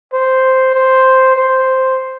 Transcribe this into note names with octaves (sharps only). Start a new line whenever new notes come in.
C5
C5
C5